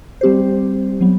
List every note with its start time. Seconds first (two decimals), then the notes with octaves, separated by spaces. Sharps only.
0.21 G3 C4 G4 C5
1.01 F#3 B3